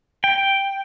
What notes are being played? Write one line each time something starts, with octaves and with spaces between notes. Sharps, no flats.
G5